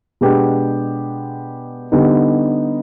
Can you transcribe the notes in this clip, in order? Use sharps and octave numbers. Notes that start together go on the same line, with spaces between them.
B2 G#3 B3 D4 G4
D3 G3 B3 D#4